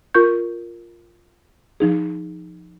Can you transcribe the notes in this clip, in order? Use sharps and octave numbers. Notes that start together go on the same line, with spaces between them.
F4 A#4 C#6 G6
F3 D#4 G#4